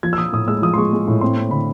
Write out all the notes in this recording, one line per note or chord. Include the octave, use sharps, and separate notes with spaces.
F3 G#6
E6
F3 D#6
A2 D#6
G#3 E6
F3 D#6
C6
G#3 C#6
G#3
A2
C4 C6
C4
D3 B5